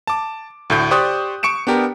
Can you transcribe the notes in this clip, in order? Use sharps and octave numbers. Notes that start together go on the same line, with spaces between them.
A5 D6
D2 A2 G6
G4 C5 D5 C#6 D#6 F#6
C#6 C#7 D7 E7
B3 D4 G4 A#4